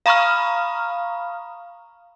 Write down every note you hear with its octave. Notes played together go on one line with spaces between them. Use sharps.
F5 A#5 B5 C#6 D#6 F6